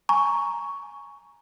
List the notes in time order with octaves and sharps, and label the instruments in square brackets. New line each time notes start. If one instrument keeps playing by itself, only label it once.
[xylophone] G#5 A#5 C#6